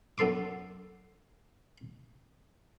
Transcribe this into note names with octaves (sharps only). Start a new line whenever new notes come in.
F#2 B3 A4 C6 D6